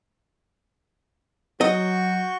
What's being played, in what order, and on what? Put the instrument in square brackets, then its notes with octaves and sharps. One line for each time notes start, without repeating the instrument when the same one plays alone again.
[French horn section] F#3 [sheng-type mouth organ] F#4 C#6 G6 [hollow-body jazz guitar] D#5